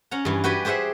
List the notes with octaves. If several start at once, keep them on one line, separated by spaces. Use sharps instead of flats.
C#4 F#5 A#5
G2 E3
F#4 G4 B4 D5 G5 G#5
G4 G#4 C5 E5 F#5